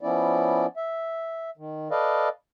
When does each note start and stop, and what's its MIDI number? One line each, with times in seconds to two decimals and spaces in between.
0.01 0.66 53
0.01 0.66 59
0.01 0.66 61
0.01 0.66 64
0.01 0.66 74
0.77 1.50 76
1.57 1.88 51
1.91 2.29 69
1.91 2.29 71
1.91 2.29 74
1.91 2.29 75
1.91 2.29 77